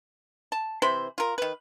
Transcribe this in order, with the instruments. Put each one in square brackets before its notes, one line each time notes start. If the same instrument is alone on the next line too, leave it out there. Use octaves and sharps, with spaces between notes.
[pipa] A5
C3 E3 C5 B5
F4 A#4
D#3 B4